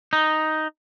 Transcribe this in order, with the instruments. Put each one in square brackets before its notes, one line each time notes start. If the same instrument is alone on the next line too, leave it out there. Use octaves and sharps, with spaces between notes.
[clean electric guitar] D#4